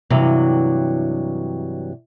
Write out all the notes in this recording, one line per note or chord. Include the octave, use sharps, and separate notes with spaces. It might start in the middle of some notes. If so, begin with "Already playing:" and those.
G2 C3 E3 F#3